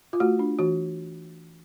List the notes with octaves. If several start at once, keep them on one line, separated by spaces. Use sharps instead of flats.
F4
A3 F#4
D4
E3 F#4